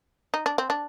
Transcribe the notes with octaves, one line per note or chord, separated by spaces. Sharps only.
D#4
D4
C4
D4